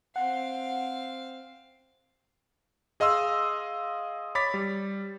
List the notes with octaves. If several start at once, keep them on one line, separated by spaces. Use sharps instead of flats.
C4 F5 F#5
G#4 D#5 F5 C6 E6
C#5 B5 D6 A6 B6
G3